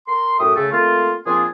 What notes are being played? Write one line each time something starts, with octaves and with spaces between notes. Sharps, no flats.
A#4 C6
F#2 A2 F#4 E5 G5 D#6
C#3 A3
A3 A#3 C4 F4
A#2 F3 C4 D4 F4 G#4